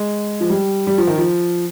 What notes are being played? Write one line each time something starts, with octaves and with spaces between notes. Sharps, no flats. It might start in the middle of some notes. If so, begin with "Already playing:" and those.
Already playing: G#3
F3
G3
G3
F3
D#3
F3